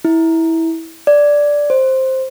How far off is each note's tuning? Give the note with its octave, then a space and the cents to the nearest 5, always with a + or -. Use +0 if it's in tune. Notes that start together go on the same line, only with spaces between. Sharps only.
E4 -15
D5 -5
C5 +5